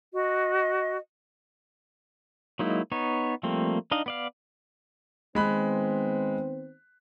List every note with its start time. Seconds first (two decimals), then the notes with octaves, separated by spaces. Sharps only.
0.14 F#4 D#5
2.59 F#3 G#3 A#3 D#4 E4
2.92 B3 D#4 C#5
3.43 F3 G3 A3 A#3 C4
3.91 D4 D#4 D#5 F5
4.06 B3 D5 F5
5.35 D#3 G#3 B3 C4 B5 F#6